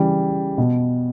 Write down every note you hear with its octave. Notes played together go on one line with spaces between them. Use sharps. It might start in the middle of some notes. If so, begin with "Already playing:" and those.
Already playing: C#3 E3 G3
B2